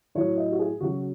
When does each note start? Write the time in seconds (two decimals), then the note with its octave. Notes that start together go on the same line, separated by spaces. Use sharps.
0.15 A2 F#3 C#5
0.37 D#5
0.52 F#4
0.59 G#4
0.81 C#3 F#3 F#4